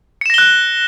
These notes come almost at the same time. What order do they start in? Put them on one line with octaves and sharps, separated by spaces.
C#7 E7 A#6 G7 F#6